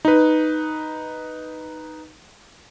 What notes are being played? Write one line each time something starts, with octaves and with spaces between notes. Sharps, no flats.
D#4 B4